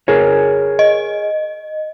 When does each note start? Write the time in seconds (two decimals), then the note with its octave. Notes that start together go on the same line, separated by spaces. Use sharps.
0.08 G#4 A#4 C#5
0.79 D#5